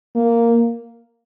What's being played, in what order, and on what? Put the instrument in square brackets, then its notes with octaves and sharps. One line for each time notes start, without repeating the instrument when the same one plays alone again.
[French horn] A#3